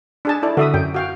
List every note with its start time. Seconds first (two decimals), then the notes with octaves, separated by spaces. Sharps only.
0.25 D4 G#4 A5
0.43 E4 A4 D5
0.57 D3 F#4 E5 D#6
0.74 F#2 G5
0.94 F#4 F5 G5